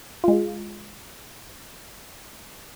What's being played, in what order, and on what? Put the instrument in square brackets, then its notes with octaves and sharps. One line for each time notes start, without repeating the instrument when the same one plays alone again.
[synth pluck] G#3 F4